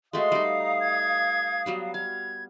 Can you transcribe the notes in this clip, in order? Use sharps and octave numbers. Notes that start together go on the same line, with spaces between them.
G#3 A3 F#4 F5 C6 D#6
G3 D#4
A#5
G#6
F#3 G3 B3
F5 G#6